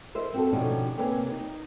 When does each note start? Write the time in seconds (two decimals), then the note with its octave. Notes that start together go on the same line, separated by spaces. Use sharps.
0.15 E4 A#4 C5 D#5 E5
0.34 C4 F#4 A4
0.53 B2 D3 F3 C#4 D#4 G4
0.97 C3 A#3 B4 C#5 E5 G#5
1.31 D#4